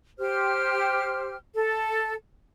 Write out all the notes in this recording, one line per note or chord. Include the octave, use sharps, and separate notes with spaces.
G4 C5 F6
A4